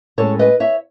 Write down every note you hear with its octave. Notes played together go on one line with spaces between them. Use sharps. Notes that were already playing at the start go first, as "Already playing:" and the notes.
A2 G#3 C#4 A4 C#5
B4 D#5
C#5 E5